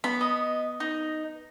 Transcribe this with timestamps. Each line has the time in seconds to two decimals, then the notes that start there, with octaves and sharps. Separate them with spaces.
0.04 B3 B5
0.21 D#5
0.80 D#4